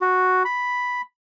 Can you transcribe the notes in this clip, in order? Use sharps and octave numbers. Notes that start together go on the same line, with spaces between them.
F#4
B5